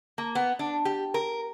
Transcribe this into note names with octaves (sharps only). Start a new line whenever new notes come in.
A#3
B3
D4
G4
A#4